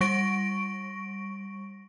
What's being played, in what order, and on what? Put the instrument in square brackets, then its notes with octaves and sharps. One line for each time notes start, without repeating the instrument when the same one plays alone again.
[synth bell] G3 C#6 A#6 D7